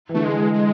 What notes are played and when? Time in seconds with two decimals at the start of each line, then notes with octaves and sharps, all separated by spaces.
0.09 E3
0.14 D3 A3
0.24 G#3
0.39 E3
0.53 G#3